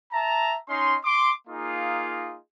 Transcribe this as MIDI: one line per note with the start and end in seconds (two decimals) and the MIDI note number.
0.11 0.55 76
0.11 0.55 81
0.11 0.55 82
0.68 0.95 61
0.68 0.95 63
0.68 0.95 84
1.04 1.31 84
1.04 1.31 86
1.48 2.36 58
1.48 2.36 63
1.48 2.36 65
1.48 2.36 68